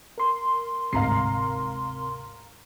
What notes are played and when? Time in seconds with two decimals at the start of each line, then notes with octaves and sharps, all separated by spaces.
0.18 A#4 C6
0.93 G1 D2 G#2 C3 F5 A#5 C7